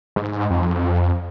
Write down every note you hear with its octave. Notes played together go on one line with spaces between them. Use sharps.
G#2
F2